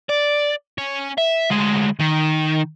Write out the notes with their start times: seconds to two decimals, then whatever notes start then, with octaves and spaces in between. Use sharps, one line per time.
0.09 D5
0.78 C#4
1.18 E5
1.50 D2 G#3
1.99 D#3